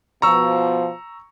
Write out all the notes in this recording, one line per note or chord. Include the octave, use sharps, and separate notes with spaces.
B2 F3 A#5 C#6 E6